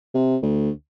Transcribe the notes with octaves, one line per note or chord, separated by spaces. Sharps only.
C3
D2